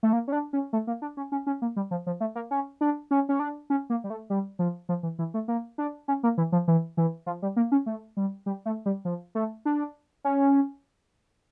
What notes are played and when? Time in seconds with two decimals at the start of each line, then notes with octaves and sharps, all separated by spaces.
0.03 A3
0.13 A#3
0.28 C#4
0.32 D4
0.53 C#4
0.73 A3
0.87 A#3
1.02 D4
1.17 C#4
1.32 C#4
1.47 C#4
1.62 A#3
1.76 G3
1.91 F3
2.07 F3
2.20 A3
2.35 A#3
2.51 C#4
2.81 D4
3.11 C#4
3.29 C#4
3.40 D4
3.70 C#4
3.90 A#3
4.04 G3
4.10 A3
4.30 G3
4.59 F3
4.89 F3
5.03 E3
5.19 E3
5.34 A3
5.48 A#3
5.78 D4
6.08 C#4
6.23 A#3
6.38 E3
6.52 F3
6.68 E3
6.97 E3
7.26 F3
7.42 G3
7.56 A#3
7.72 C#4
7.86 A3
8.17 G3
8.46 G3
8.66 A3
8.86 G3
9.05 F3
9.35 A3
9.65 D4
10.24 C#4